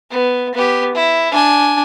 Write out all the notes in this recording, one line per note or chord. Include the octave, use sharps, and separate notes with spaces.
B3
B3 G4
E4
D4 G#5